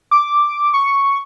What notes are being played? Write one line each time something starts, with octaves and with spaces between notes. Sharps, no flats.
D6
C#6